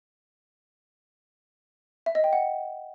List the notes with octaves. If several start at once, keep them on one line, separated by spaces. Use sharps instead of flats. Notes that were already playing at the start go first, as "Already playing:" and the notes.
E5
D#5
G5
F#5